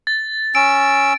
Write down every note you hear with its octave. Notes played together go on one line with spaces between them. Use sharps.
A6
C#4 E6 D7